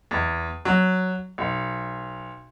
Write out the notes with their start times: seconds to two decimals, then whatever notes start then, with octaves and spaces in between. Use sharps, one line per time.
0.11 E2
0.65 F#3
1.38 B1